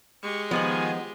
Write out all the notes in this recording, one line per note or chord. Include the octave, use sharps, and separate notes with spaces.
G#3 G4 C#6
D#3 F3 B3 D#4 F4 F#5 G#5